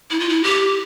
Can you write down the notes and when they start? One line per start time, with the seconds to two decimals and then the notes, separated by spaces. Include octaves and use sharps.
0.10 E4
0.20 F4
0.29 E4
0.44 G4